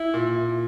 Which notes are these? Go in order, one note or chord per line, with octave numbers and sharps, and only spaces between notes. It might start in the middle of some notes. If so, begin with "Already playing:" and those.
Already playing: E4
A#2